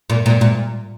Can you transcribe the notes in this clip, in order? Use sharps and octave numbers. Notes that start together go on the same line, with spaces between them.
A#2
A#2
A#2